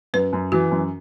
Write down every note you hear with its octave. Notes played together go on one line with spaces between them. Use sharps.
F#2 B4
F#2
E3 F#4
F#2